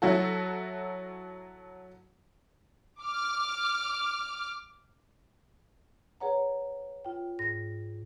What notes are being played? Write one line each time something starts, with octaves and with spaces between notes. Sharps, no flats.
F#3 E4 F#4 A4
D6 F6
G#4 B4 C#5 F#5 A#5
F4 G5
G#2 A#6